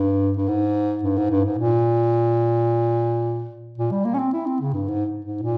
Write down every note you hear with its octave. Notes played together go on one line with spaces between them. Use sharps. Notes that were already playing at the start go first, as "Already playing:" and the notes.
Already playing: G2
G2
G#2
G2
G#2
G2
G#2
A#2
A#2
G3
A#3
C#4
C4
E4
C4
C#3
G2
G#2
G#2
A#2